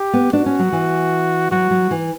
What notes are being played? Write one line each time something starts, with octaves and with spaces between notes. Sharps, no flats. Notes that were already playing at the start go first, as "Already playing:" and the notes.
Already playing: G4
B3
D4 F#4
C#4
F#3
E3
F#3 F#4
F#3
E3